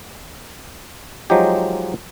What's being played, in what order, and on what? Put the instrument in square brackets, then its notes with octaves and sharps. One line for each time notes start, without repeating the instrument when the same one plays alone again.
[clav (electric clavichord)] F3 F#3 G#3 D#4 G4